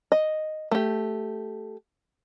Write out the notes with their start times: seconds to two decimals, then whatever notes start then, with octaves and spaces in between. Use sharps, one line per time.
0.12 D#5
0.71 A3 G4